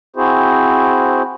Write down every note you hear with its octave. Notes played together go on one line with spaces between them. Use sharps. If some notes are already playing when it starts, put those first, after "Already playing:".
C4 E4 F#4 G#4 C5